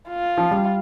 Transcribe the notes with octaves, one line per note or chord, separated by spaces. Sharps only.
F4
F3
G3